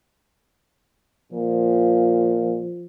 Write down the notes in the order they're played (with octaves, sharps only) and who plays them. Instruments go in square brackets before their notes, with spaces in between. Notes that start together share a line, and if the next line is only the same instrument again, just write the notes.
[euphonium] A#2 [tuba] F3